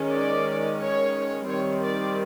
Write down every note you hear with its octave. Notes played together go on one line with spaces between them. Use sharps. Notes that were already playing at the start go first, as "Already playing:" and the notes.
Already playing: D#3 G#3 C#4
D5
C#5
D#3 G3 C4 C#5
D5